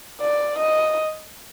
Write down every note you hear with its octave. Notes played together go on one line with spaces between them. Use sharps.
D5
D#5